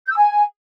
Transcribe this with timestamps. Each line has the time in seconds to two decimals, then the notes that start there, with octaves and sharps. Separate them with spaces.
0.07 G6
0.12 E6
0.18 G#5